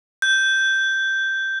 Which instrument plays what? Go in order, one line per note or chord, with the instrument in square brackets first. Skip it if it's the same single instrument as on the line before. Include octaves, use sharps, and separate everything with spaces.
[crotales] G6